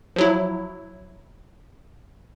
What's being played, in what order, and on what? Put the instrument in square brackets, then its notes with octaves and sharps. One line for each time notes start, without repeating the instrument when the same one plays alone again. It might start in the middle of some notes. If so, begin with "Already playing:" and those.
[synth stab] F3 F#3 E4